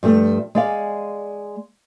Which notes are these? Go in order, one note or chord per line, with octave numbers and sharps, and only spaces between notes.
G2 F3 A3
G#3 D5 F5